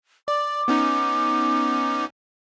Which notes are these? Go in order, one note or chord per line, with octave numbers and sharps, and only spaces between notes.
D5 D6
B3 C#4 D#4